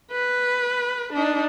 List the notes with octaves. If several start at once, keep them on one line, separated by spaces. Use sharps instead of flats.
B4
D4 D#4